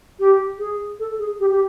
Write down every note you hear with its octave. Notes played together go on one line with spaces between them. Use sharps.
G4
G#4
A4
G#4
G4
G4